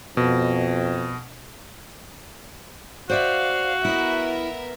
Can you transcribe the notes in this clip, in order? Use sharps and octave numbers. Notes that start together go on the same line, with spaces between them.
F2 B2
F#4 C5 D5 E5 F5
B3 E4 A#4 D#5 E5